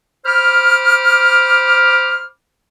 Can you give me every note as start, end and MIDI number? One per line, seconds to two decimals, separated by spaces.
0.25 2.26 72
0.25 2.26 83
0.25 2.26 86
0.25 2.26 89